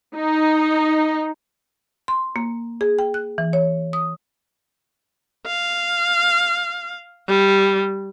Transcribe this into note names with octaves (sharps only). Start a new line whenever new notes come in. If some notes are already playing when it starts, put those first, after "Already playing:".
D#4
C6
A#3
G#4
G5
F#6
E3
C#5
D#6
F5
G3